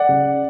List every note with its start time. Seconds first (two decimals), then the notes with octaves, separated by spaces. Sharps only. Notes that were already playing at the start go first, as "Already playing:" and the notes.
Already playing: D5 F#5
0.09 C#3